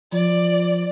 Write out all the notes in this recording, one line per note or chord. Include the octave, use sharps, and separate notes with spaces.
F3 D5